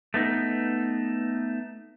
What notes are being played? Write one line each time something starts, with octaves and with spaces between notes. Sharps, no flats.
A3 B3 D#4